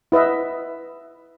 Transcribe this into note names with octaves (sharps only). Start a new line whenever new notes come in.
E4 B4 D#5 E5